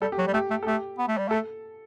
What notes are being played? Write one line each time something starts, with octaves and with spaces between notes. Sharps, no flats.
G3 A4
G4
F#3
G3
A3 G4
A3
A4
A3 G4
B3
A3
G3
A3 A4